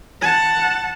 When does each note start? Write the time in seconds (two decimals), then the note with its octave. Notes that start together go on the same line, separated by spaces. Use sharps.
0.21 F#5 A5